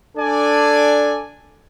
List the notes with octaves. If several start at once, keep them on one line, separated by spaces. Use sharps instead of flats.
D4 A4 D5 G#5